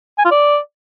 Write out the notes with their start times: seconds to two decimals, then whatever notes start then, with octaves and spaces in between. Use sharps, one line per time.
0.18 G#5
0.25 F4
0.31 D5